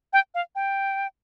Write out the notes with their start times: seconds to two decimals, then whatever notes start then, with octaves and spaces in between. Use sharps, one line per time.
0.13 G5
0.34 F5
0.55 G5